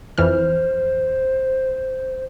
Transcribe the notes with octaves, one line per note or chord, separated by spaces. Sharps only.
F2 E3 C5 F6